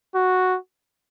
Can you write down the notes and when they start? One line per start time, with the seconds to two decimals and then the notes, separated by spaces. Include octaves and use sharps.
0.15 F#4